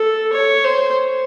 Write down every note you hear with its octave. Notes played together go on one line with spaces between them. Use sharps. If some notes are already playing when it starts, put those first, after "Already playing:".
Already playing: A4
C#5
C5